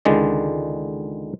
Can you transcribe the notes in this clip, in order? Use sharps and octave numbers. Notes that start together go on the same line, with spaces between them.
C#2 D3 D#3 G#3 D5